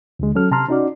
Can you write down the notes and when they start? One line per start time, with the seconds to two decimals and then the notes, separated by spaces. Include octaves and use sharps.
0.19 D2 D3 G#3
0.35 F#3 C#4 A4 F6
0.51 C3 A5 A#5 C6 F6
0.69 C#4 D#4 F#4 D5